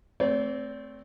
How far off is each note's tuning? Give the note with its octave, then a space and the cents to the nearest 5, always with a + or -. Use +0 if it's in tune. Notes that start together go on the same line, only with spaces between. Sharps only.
A3 +0 C4 +0 D5 -40